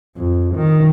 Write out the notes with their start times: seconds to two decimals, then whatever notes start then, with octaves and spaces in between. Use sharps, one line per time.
0.17 F2
0.55 D#3